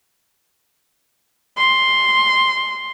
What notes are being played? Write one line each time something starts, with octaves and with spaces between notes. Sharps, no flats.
C6